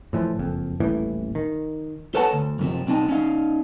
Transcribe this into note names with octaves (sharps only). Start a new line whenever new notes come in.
A2 E3 F3
F#1 F2
D#1 A1 A2 E3
D#3
A4 B4 C#5 F#5 A5
D2
F#2 C3 F3
B1 C4 D#4 A5
C#4 D#4 F5